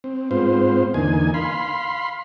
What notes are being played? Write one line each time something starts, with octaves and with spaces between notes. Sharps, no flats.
C4
G#2 B3 C4 F4 C5
E2 D3 A#3 D#4 G#5
F5 B5 C6